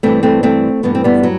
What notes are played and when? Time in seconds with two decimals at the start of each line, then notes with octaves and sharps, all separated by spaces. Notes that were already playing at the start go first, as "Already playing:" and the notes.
0.03 G2 E3 A3 C4
0.23 A3 C4
0.43 A3 C4
0.83 G2 E3 B3
0.95 C4
1.04 G3 B3
1.23 F#3